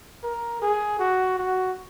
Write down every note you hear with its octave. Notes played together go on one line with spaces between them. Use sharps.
A#4
G#4
F#4
F#4